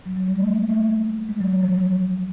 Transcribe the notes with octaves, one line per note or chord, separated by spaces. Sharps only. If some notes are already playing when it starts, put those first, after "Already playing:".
F#3
F#3
G3
A3
A#3
A3
A3
G#3
F#3
F#3
F3
F#3